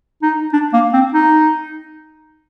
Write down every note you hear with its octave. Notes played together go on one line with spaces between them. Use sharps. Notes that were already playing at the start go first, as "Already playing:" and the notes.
D#4
D4
A#3
C4
D#4